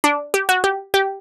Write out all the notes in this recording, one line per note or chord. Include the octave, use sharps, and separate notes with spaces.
D4
G4
F#4
G4
G4